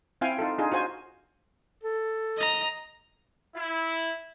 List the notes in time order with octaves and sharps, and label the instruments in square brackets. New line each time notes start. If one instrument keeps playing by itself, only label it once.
[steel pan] C4 E4 F4 F5 G5 G#5
D#4 F4 A4
D4 D#4 F4 G#4
F4 F#4 C5 G#5
[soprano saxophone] A4
[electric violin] D#5 A#5
[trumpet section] E4